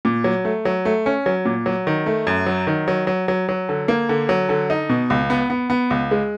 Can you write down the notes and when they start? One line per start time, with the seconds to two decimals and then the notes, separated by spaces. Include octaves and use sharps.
0.05 A#2
0.24 F#3
0.45 A3
0.65 F#3
0.85 A3
1.06 C#4
1.26 F#3
1.45 A#2
1.66 F#3
1.87 D#3
2.06 A3
2.27 F#2
2.46 F#3
2.67 D#3
2.88 F#3
3.07 F#3
3.28 F#3
3.49 F#3
3.69 D3
3.88 A#3
4.09 D3
4.29 F#3
4.49 D3
4.70 D#4
4.89 B2
5.10 C#2
5.30 B3
5.50 B3
5.70 B3
5.90 C#2
6.11 G#3